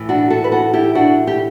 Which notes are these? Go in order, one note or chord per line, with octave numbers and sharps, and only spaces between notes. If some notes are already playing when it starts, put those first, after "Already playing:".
Already playing: A2 E3
D4 F#4
F#4 A4
B4
F#4 A4
E4 G4
D4 F#4
G4